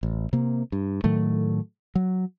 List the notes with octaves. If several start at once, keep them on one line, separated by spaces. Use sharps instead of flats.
A1
C3 A#3
G2
A2 D#3 F#3 A3
F#3